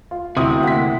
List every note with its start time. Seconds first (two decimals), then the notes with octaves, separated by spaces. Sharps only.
0.11 F4
0.37 D2 C3 C4 E4 F#4 D#6
0.63 A#3 E4 F#5 B6